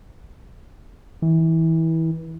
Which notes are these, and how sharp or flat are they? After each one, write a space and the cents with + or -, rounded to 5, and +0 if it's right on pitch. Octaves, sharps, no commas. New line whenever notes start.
E3 -25